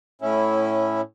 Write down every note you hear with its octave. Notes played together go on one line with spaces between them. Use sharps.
A2 C#4 E4